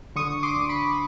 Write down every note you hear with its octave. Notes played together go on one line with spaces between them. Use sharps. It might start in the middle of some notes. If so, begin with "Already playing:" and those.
D3 C#6 D#6
C6 D6
D2
B5 C#6